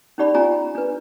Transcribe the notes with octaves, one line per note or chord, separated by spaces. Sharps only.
C#4 D#4 G4 D5 B5
C#4 F4 G4 G#5 A#5
D4 B4